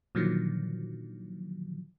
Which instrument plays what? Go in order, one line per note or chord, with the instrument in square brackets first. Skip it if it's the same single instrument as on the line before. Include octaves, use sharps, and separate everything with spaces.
[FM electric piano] A#2 D3 D#3 F3 F#3